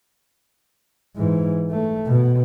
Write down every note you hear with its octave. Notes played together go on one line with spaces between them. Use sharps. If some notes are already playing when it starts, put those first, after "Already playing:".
G#2 E3
A3
B2